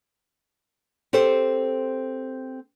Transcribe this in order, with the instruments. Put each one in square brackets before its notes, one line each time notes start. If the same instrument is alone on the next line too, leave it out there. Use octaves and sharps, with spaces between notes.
[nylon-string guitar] C4 G4 A4 C5